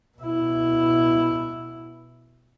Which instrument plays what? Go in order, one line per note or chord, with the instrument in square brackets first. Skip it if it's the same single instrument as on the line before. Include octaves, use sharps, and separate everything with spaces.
[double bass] B2 E4